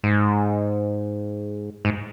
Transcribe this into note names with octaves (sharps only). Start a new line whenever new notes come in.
G#2
G#2